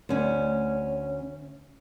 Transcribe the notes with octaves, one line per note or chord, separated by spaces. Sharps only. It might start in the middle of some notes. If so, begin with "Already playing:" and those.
D2 C#4